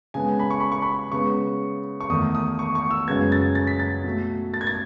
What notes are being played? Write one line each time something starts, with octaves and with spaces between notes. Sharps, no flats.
C#3 G#3 B3 G#5
B5
C#6
B5
C#6
B5
C#3 G#3 B3 C#6
C#6
E2 D#3 A3 D#6
D#6
C#6
C#6
E6
F#2 C#3 G#3 B3 G#6
A6
A6
B6
A6
B2 A3
A6
G#6
A6